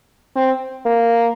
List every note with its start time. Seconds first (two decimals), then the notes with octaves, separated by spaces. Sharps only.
0.36 C4
0.85 A#3